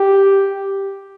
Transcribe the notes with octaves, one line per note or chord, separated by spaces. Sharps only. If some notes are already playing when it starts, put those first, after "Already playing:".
Already playing: G4